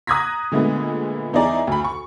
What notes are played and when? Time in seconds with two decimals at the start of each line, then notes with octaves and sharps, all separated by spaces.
0.07 A#5 D#6 F#6 G#6 A#6 B6
0.52 A#2 D3 G#3 A3 B3
1.33 E2 D#4 E4 G#4 D5 A#5
1.67 D2 B5
1.84 C#6